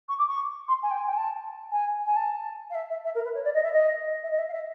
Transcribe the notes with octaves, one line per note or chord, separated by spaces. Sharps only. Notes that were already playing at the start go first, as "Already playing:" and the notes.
C#6
D6
C#6
C6
G#5
G5
G#5
G5
G#5
A5
G#5
G#5
A5
F5
E5
E5
E5
A#4
B4
C#5
D5
D#5
E5
D#5
E5
D#5
E5
F5
E5